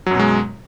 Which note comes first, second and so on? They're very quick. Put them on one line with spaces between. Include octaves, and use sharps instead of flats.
F#3 F#2 B2 G#3